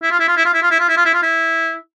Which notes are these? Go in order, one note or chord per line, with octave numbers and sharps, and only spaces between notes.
E4
F4
E4
F4
E4
F4
E4
F4
E4
F4
E4
F4
E4
F4
E4